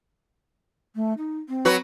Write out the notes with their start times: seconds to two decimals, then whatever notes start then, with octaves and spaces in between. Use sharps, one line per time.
0.95 A3
1.17 D#4
1.48 C4
1.65 F#3 F#4 B4